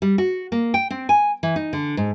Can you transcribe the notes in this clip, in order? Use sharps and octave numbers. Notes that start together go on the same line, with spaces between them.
G3
F#4
A#3
G5
C4
G#5
E3
D#4
D3
G#2